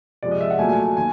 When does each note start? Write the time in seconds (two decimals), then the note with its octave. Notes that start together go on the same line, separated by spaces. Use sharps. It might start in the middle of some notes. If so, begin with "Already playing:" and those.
0.23 C3 F3 G#3 D5
0.31 D#5
0.41 E5
0.50 F#5
0.59 A#2 F#3 A3 G#5
0.69 G#5
0.97 D#3 G#5